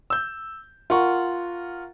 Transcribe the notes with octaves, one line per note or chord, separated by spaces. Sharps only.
E6 G6
F4 A#4 F#5 C#6